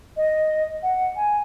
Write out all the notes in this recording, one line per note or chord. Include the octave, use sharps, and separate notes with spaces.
D#5
F#5
G#5